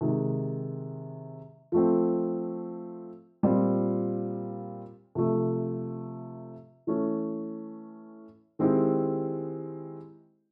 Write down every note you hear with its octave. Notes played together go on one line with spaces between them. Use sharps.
C3 D#3 G#3
F3 A3 C4
A#2 G3 C4 F4
C3 F3 A3
E3 A3 C#4
D#3 G#3 C4 E4 G4